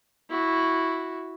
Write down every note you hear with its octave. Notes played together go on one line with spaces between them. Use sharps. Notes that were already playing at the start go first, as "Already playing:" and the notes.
E4 F#4